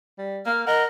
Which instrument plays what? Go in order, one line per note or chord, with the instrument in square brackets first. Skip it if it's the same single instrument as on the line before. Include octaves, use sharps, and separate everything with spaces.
[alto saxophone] G3
[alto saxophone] A#3 [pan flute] F6
[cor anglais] A#4 [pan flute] D#5 [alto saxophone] F#5